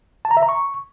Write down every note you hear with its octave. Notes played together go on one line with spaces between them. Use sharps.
A5
A#5
E5
A#5
C#6